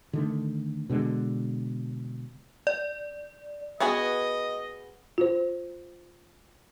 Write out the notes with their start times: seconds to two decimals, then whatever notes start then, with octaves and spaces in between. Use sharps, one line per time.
0.13 D3 D#3 A3
0.89 B2 D3 G#3
2.67 D5
3.80 B3 F#4 G#4 D#5
5.18 F4 C5